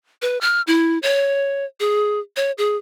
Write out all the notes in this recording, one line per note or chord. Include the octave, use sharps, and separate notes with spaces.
B4
F6
E4
C#5
G#4
C#5
G#4